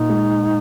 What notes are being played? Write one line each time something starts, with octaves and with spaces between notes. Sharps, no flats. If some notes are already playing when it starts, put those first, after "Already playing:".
Already playing: A#2 D#4
G#3